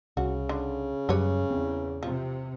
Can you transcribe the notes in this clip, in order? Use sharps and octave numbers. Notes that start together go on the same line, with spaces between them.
C2 C#3 F#4
D3
F#2 F#3 G3 G4 B4 C#5
E2 C4
C3 F3